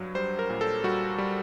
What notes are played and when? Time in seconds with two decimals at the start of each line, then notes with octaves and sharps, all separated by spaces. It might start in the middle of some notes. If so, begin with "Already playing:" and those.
Already playing: G2 F#3
0.15 G3 C5
0.39 A#4
0.50 A#2
0.61 A4
0.84 G3 F#4
1.18 G3